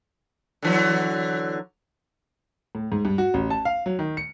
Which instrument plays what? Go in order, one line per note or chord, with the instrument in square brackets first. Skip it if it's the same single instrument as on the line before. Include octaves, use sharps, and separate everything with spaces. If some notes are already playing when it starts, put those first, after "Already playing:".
[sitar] D3 E3 F#3
[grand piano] A2
G#2
G2
F#4
A1
A5
F5
F#3
D#3
C#7